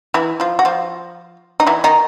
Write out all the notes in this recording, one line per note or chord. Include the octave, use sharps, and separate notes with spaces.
E3 E4
F3 F4
F#4
F3 F4
D#4
E3 E4
D#3 D#4